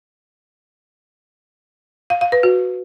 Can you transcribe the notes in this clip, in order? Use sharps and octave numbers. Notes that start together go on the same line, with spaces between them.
F5
F5
B4
F#4